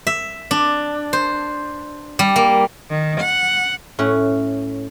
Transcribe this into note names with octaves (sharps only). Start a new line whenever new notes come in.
E5
D4
C5
G3
A#3
D#3
F#5
A2 C#4 F#5